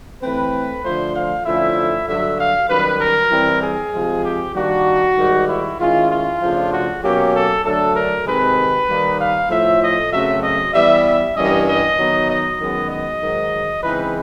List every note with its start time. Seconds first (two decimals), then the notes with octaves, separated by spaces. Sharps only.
0.23 E3 A3 C4 B4
0.83 D3 F3 A3 C5
1.15 F5
1.45 D3 F3 A3 C#4 E4 E5
2.07 G2 D3 F#3 E5
2.39 F5
2.69 F#2 D#3 G3 B4
3.00 A#4
3.31 E3 G3 C4 E4
3.63 G#4
3.93 C3 F3 G#3
4.25 G4
4.55 D#3 G3 A#3 D4 F#4
5.17 G#2 D#3 G3
5.48 E4
5.79 D#3 G#3 C#4 E4 F4
6.11 F4
6.41 C#3 F3 A3 D4
6.72 F#4
7.03 B2 F#3 A#3 C#4 G4
7.34 A4
7.64 D3 F#3 A3 D4 A4
7.95 A#4
8.27 C3 D#3 G#3 C4 B4
8.88 D#3 G3 A#3 D#4
9.20 F5
9.50 A2 F3 A3 E5
9.82 D#5
10.12 F#2 C#3 F#3 A3 C4 E5
10.43 D#5
10.74 E3 G3 B3 E5
11.06 E5
11.36 G2 E3 G3 A#3 C#4 D#5
11.68 D#5
11.98 D#3 F#3 B3 D#4
12.29 D#5
12.61 F#2 D#3 G#3 B3
12.91 D#5
13.22 G#2 D#3 F#3
13.83 C#3 E3 G#3 C4 D#4 B4